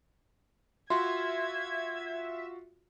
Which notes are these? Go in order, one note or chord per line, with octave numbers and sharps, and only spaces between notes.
F4 F#4 E5 C6 G#6